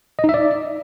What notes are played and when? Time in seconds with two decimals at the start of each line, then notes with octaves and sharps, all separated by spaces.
0.19 D#5
0.24 D#4
0.29 E5
0.34 D5